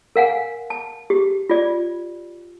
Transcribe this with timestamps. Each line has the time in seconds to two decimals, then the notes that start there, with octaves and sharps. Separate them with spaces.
0.16 A#4 F5 F#5 G#5
0.70 A5
1.10 G4
1.49 F4 D5